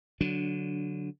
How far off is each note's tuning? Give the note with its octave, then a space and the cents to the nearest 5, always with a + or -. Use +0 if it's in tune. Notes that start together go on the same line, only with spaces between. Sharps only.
D3 -15 F#3 +0 D4 +0